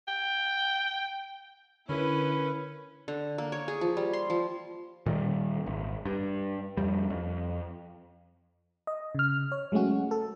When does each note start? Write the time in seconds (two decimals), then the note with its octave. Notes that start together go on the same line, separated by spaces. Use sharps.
0.08 G5
1.89 D3 C#4 E4 A#4 B4 B5
3.08 D3
3.38 A#3
3.52 C#5
3.68 G#4
3.81 F3
3.97 G3
4.13 C6
4.30 F3
5.06 A#2 D#3 G3
5.66 G#1
6.05 G2
6.77 F2 G3
7.10 F2
8.87 D#5
9.15 C#3 F6
9.52 C#5
9.72 F#3 G#3 A3 C#4 F#4
10.11 A4